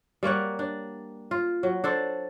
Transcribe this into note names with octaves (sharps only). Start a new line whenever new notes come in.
G3 A#3 C#5 F#5
D4
F4
F#3
D4 A4 C5